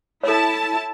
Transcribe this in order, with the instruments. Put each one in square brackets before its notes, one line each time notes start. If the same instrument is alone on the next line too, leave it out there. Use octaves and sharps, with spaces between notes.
[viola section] E4 A5 [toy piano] A4 C#5